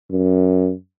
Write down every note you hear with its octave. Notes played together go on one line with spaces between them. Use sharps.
F#2